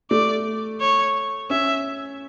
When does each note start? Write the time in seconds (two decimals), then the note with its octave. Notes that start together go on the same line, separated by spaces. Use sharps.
0.11 A3 D5
0.81 C#5
1.50 C#4 E5